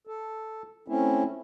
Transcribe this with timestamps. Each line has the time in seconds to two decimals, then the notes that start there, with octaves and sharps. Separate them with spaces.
0.07 A4
0.88 A3 C4 C#4 E4